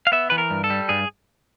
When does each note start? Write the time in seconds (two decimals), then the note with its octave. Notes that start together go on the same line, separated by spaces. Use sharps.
0.07 F5
0.12 B3 E5
0.30 E3 B4
0.38 A#4
0.50 G2
0.64 A4
0.70 G3
0.89 G2 G#4